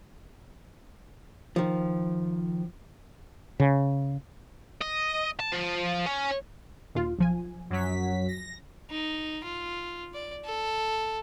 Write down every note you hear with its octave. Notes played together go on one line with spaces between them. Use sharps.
D#3 F3
C#3
D#5
A5
F3
C#4
D#2 A#2 F4
B1 F3 G#5
F#2 F#3 B6
A#6
D#4
F4
D5
A4